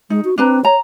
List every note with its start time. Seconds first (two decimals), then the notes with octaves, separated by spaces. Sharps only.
0.10 G#3 D#4
0.25 F#4
0.38 C4 D4 B4 A#5
0.65 C#5 A#5